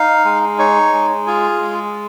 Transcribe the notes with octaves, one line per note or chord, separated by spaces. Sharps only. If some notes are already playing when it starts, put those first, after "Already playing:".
Already playing: D#4 F5
G#3
D#4 C#5
G#3
F4 G#4
G#3